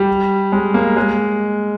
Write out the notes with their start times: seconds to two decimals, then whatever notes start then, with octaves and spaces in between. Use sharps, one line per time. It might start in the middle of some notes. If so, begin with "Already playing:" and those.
Already playing: G3
0.52 G#3
0.74 A#3
0.97 G#3